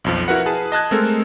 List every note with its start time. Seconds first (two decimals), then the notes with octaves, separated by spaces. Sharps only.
0.04 B1 F2 F3
0.28 E4 F#4 A#4 B4 F#5
0.46 G#4 B4 A5
0.72 D#5 A5 F#6 G#6
0.91 G#3 A3 C4 A4 A#4